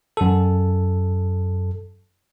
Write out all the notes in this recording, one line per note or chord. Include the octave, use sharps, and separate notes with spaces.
F#2 A4